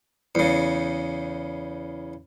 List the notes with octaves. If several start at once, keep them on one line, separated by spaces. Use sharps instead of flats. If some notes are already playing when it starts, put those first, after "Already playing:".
E2 C#3